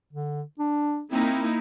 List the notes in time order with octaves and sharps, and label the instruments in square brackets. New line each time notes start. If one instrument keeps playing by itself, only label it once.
[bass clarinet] D3
D4
[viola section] A#3 D#4 E4 [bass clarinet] C4